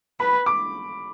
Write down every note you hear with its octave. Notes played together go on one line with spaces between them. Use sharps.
B4 B5
D6